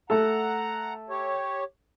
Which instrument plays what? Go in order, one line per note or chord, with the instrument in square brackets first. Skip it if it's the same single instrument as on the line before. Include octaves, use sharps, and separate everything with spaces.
[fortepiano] A3 A4 [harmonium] F#5 A#5
[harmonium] G4 C#5